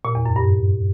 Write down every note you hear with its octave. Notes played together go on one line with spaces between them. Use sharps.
A#2
E2
F#2
G2